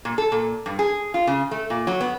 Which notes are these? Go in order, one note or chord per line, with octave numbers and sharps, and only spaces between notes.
A#2
A4
A#2
G2
G#4
F4
C#3
A3
A#2
F#3
B3